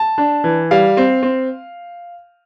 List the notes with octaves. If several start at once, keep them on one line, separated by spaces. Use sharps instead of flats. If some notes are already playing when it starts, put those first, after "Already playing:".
Already playing: A5
D4
E3
G3 F5
C4
C4